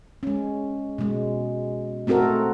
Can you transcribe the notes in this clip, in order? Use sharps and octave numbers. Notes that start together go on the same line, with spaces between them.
G#3 C#4
B2 G#3
A3 C4 F#4 A4 A#4